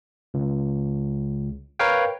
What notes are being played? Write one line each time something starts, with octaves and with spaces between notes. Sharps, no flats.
C#2
A#4 B4 C#5 F5 G5